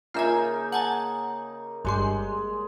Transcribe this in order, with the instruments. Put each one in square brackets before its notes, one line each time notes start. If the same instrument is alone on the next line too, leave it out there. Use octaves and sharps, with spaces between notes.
[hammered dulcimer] C#3 A#3 D#4 [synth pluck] F4 E5 G#5
[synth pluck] F#5 G#5 A5
[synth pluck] G1 G2 C6 [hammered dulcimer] G#3